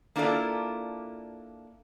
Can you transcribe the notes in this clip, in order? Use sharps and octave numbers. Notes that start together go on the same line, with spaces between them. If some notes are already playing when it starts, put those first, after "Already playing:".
A#3 D4 E4 F4 A4 D5